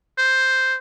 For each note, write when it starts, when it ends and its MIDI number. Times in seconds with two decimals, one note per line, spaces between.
0.18 0.77 72